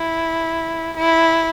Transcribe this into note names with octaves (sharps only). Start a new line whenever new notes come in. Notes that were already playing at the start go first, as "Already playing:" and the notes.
Already playing: E4
E4